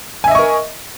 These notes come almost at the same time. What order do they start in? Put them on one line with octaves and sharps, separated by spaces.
G#5 E5 D#5 C#6 A#4